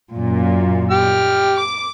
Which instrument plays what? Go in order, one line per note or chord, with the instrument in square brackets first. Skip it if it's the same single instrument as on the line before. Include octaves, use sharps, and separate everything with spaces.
[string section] F#2 A#2
[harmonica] G4 F6
[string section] D6